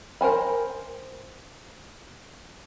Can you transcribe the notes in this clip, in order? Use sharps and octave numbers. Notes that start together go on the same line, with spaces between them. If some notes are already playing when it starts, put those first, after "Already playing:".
A#4 C5 G#5 B5